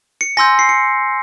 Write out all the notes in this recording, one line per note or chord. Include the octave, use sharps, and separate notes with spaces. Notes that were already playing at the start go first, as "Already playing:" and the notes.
C#7
G#5 C6 E6 G6 A#6
C7
C#7